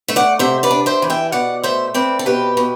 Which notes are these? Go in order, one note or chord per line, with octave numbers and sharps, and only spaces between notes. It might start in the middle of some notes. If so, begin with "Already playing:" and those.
A3 E5
D5 F#5
C3 C5 E5
B4 D5
D4
C5 E5
E3
E5 G5
B2 D5 F#5
A3 C5 E5
C4 B4 D5
A4
B2 G4 B4
B2